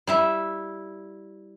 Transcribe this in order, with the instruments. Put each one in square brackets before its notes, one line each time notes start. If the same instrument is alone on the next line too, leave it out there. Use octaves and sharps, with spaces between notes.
[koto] G3 E4 E5